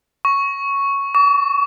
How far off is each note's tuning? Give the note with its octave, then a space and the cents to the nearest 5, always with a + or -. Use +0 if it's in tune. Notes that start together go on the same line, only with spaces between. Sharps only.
C#6 +0
C#6 +40